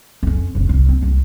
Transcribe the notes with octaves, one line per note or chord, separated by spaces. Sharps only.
F2 C#4
F1 A#1
C2 G3
C4
C2 F4